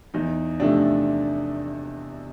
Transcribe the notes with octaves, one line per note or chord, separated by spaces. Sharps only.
E2 D#4
C3 F3 A3 D4